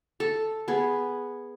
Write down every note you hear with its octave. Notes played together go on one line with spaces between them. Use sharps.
A4
B3 G#4